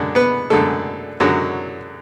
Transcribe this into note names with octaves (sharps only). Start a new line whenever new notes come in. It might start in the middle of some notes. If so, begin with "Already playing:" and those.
Already playing: F#2 D3 G#3 D4
B3 B4
F#2 D3 G#3 A3 A4
F#2 D3 F#3 G#3 F#4